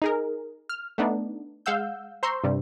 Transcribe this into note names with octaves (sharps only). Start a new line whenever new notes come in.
D#4 G#4 A#4
F6
A3 B3 D4 D#4
G#3 F5 F#5 E6 G6
C5 A#5 C6 C#6 E6 G6
G2 C3 G3